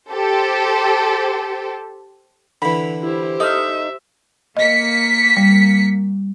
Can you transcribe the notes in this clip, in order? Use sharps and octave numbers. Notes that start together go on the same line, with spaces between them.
G4 A4 C5
D3 E3 B5
E4 G4 C5
D#4 A4 E5 F6
A#3 D#5 B6 C#7
G3